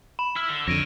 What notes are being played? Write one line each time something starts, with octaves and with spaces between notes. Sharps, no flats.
B5 E7
E4 E6 F6
D3
F2 D3 D#4 C#5 A#6 D7 D#7